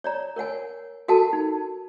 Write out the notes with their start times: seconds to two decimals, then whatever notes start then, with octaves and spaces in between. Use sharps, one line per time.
0.04 C#5 D5 A#5
0.36 A#4 C#5 F#5 G#5
1.08 F#4 A4 A#4 F#5 G#5 A5
1.33 D#4